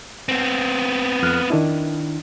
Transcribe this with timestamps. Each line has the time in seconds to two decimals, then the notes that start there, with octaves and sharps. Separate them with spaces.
0.29 B3 C4
1.23 F2 F6 F#6
1.50 D#3 D4 E4